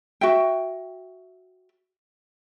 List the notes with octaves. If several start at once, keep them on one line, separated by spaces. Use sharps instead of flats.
F#4 E5 G5